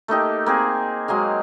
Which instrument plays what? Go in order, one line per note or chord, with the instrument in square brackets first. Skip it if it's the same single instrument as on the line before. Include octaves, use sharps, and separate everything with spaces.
[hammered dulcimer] A3 A#3 D#4 G4
A#3 C4 G#4
F#3 G#3 A#3 F5